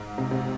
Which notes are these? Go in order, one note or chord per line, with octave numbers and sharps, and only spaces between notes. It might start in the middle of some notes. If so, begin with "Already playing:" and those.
Already playing: G#2
C3
C3